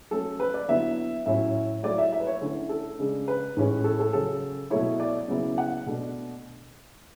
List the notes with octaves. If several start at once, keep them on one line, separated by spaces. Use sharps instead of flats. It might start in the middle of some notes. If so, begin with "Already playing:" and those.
F#3 A3 C#4 A4
B4
D5
D3 F#3 B3 E4 E5
A2 F#3 C#4 E4 E5
F#3 A3 E4 D5
E5
E5
B4
C#5
D3 A3 C#4 E4
A4
C#3 G#3 D4
B4
A2 E3 G#3 C#4
A4
A4
C#3 F#3 C#4 A4
B2 F#3 A3 E4 C#5
D5
C#3 F#3 B3 E4
F#5
B2 A3 D4